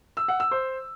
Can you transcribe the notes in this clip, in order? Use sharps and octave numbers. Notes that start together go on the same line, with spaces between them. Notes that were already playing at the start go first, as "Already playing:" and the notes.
E6
F#5
E6
C5